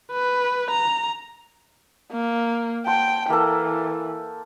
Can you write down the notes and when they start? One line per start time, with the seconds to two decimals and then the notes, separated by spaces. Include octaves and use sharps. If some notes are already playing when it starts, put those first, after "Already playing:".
0.12 B4
0.71 A#5
2.12 A#3
2.86 C5 F#5 G5 A5
3.30 E3 A#3 A4